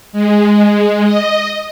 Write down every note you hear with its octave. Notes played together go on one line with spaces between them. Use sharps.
G#3
D#5